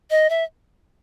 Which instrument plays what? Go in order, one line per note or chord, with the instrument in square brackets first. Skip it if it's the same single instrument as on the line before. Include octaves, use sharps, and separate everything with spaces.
[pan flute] D#5
E5